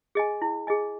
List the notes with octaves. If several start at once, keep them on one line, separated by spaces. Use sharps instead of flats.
G#4 D#5 G#5
E4
G#4 D#5 G#5